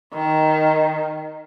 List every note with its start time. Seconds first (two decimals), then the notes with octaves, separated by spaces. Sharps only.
0.14 D#3